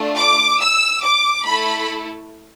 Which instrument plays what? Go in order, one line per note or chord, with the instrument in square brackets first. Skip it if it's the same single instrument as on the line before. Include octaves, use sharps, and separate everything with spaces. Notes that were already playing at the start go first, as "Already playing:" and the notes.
Already playing: [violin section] A3 D4 F4
D6
E6
D6
A3 E4 A4 B5